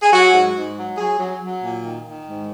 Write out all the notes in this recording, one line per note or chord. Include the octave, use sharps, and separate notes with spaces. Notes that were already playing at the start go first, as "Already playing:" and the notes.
G#4
F#3 F#4
G#2
G#2
F#3
F#3 G#4
F#3
F#3
A#2
D#3
D#3
G#2